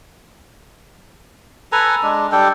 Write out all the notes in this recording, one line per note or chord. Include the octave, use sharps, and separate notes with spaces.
A4 B4 G#5 A#5
G#3 D4
G3 D4 A4 G5